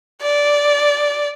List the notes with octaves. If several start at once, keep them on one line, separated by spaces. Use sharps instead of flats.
D5